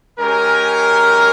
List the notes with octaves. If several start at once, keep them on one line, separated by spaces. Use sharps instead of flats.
G#3 C#4 G4 A#4